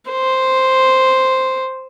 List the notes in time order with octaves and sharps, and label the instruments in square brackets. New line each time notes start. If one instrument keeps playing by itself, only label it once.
[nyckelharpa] C5